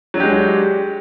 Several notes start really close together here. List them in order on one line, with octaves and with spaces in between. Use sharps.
F#3 D4 G4 G#3